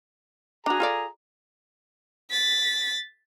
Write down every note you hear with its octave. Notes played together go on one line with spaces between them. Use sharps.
D4 F#4 G#4 A#5
F4 A4 D5
A6 B6